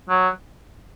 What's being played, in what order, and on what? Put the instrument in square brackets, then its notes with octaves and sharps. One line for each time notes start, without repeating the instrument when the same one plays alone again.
[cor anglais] F#3